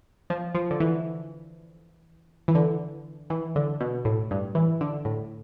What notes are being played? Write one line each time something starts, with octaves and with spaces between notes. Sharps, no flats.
F3
F3
D3
E3
E3
D3
E3
D3
B2
A2
G2
E3
D3
A2